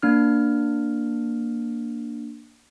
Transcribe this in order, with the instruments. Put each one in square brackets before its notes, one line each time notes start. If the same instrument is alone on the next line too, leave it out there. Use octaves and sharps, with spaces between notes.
[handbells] A#3 D4 F6